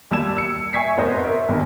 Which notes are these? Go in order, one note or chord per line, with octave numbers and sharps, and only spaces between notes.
D#2 G3 A5 E6 G#6 E7
E6 C#7
E5 G#5 C#6 G#6 B6 C7
F1 B3 A#4 C5 D#5
A#4 E5
F#1 B1 G2 D#3